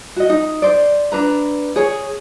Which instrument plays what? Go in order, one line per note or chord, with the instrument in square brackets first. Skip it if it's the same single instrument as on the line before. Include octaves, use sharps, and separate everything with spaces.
[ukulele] F#4 D#5
D#4
C5 D5
D4 B4 A#5
G#4 C#5